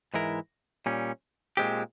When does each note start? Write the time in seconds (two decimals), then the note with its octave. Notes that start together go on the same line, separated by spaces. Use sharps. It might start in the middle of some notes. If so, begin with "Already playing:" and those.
0.14 G#2 E3 G#3 E4 A#4
0.86 A#2 G3 C#4
1.57 A#2 G#3 C4 G4